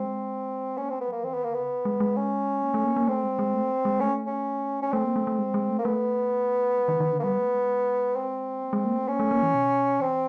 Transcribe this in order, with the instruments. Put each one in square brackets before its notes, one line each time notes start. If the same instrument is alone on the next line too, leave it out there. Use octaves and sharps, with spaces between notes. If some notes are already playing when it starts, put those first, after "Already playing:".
Already playing: [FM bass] G#3 [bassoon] C4
[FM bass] A#3 [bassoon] C#4
[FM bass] A3 [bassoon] C4
[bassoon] B3
[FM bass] F#3 [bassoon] A#3
[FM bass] E3 [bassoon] C4
[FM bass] D#3 [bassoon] B3
[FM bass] D3 [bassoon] A#3
[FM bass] C#3 [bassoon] B3
[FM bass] G#3
G#3
[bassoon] C#4
[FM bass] A#3
A3
A#3
A#3
[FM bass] A3 [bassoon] C4
[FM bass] G#3
G#3
A3
G#3
[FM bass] A3 [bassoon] C#4
[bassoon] C#4
C#4
[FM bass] A3 [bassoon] C4
[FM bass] A#3
A3
A3
G#3
G#3
A3
[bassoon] A#3
[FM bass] A3 [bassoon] B3
[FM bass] G#3
D#3
D#3
D3
[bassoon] A#3
[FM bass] G3 [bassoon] B3
[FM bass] A3
G#3
[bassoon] C4
[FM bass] A#3
G#3
A#3
A3
[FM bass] A#3 [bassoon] C#4
[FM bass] A3
A#3
E3
B2
[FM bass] E3 [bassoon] C4